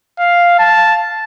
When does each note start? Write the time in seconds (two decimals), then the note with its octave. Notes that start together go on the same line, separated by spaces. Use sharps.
0.19 F5
0.59 A5